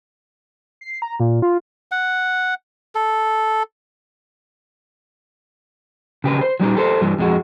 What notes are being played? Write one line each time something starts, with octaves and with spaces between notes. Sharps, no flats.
C7
A#5
A#2
F4
F#5
A4
C#3 G4 B4
C5
F#3 G3 D#4 G4
G4 A4 C5
G2 E3 G3
F2 G#3 F#4